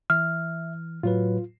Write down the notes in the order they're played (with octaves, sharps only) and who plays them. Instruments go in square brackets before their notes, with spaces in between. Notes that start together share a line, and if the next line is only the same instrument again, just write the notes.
[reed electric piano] E3 [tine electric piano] E5 [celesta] F6
[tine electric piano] A2 F#3 B4 [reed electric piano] F4